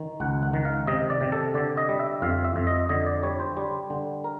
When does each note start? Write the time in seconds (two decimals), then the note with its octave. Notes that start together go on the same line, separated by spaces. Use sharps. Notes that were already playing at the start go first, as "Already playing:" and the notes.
Already playing: D#3
0.20 C#2 F#5
0.43 F#5
0.53 D#3
0.65 F5
0.87 C3 D#5
1.10 D5
1.21 C3
1.32 A4
1.54 D3 D5
1.77 D#5
1.89 G3
1.99 E5
2.22 F2 F5
2.44 E5
2.56 F2
2.67 D#5
2.89 D3 D#5
3.06 D5
3.23 G3 C#5
3.40 C5
3.57 G3
3.90 D3
4.24 A#4